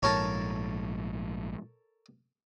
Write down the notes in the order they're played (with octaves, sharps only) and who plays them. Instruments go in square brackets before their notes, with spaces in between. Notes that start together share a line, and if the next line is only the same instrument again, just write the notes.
[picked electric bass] A#1 G#2 [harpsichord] A4 A#4 C#5